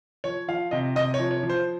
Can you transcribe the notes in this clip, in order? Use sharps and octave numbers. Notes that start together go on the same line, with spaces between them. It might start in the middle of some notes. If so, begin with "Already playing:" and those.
F3 C#5
F3 F5
C3 D#5
C3 D#5
C#5
F3
C#5
F3
C5